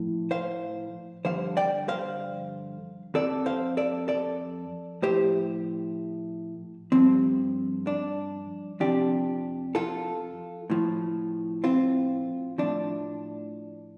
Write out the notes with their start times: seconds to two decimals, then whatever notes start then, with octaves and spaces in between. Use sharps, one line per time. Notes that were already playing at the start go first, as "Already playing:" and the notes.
Already playing: A2 F3
0.31 C5 F5
1.25 G2 D3 F3 C5 F5
1.57 D5 G5
1.88 C5 F5
3.14 F2 F3 A4 D5
3.46 C5 F5
3.77 A4 D5
4.08 A4 D5
5.02 A2 F3 G4 C5
6.92 G2 F3 C4
7.87 D4
8.80 F2 C3 F3 D4 G4
9.75 F4 A4
10.70 A2 F3
11.64 C4 F4
12.58 A2 F3 D4